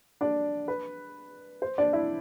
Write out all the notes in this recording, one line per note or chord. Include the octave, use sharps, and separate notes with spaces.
D4 D5
B4
C5
D4 D5
E4 E5